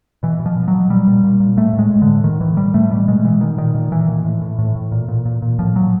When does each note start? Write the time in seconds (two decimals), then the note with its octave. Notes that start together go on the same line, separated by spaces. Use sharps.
0.23 B2 E3
0.40 B2
0.46 F3
0.56 B2
0.68 F#3
0.73 B2
0.90 A#2 G3
1.07 A#2
1.24 A#2
1.40 A#2
1.57 A2 A3
1.73 A2
1.79 G#3
1.90 A2
2.02 D3
2.07 A2
2.24 A2 D#3
2.41 A2 E3
2.57 A2 G3
2.74 A2 A3
2.90 B2 G3
3.08 B2 G#3
3.24 B2 E3
3.41 B2 D#3
3.58 A#2 D#3
3.75 A#2
3.91 A#2 E3
4.08 A#2
4.25 A2
4.42 A2
4.59 A2
4.75 A2
4.92 A#2
5.08 A#2
5.25 A#2
5.42 A#2
5.59 A2 F3
5.75 A2 F#3